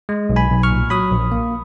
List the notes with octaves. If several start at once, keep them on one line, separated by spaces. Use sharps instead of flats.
G#3
B1
G#5 B5
B1
C#6 F6
A#2
F#3 B5 D#6
A#1
A#3